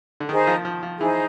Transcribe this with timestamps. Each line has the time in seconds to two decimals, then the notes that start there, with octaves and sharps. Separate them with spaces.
0.20 D3
0.29 D#3 D#4 G#4 C5
0.47 F3
0.65 F3
0.83 F3
1.00 E3 D#4 G#4 C5